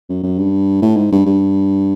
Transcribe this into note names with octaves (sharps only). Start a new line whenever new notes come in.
F#2
F#2
G2
A2
G#2
G2
G2